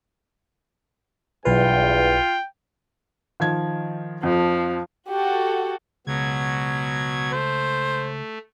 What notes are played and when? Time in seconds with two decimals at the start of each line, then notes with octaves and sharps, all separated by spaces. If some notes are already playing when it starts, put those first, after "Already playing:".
1.45 B1 E2 G2 F4 B4 G5
3.40 D#3 F3 G#6
4.23 F2 F3
5.09 F#4 G4 A4
6.07 C#2 B2 F#3 G#6
7.32 A3 C5